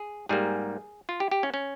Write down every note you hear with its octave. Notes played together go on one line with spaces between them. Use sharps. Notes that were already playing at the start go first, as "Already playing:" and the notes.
Already playing: G#4
G#2 G3 A#3 G#4
F4
G4
G4
C#4
C#4